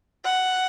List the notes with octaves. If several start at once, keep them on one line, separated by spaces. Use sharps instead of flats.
F#5